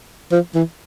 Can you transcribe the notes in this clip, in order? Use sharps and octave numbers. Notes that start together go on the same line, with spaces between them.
F3
E3